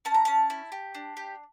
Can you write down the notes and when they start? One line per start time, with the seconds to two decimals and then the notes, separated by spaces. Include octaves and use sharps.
0.05 C#4 A5
0.14 A#5
0.25 C#4 A5
0.50 E4
0.72 G4
0.94 D4
1.17 G4